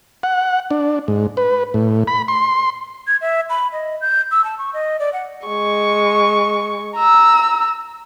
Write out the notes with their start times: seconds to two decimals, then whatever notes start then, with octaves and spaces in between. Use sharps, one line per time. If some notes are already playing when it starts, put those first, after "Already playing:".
0.23 F#5
0.71 D4
1.08 G#2
1.37 B4
1.74 A2
2.07 B5
2.28 C6
3.07 G#6
3.21 E5
3.50 B5
3.73 D#5
4.01 G6
4.31 E6
4.44 A5
4.58 C#6
4.74 D#5
5.00 D5
5.13 F#5
5.47 G#3 C#6
6.96 A#5 E6